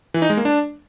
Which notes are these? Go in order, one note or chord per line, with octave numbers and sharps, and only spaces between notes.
E3
D#4
G#3
A#3
D4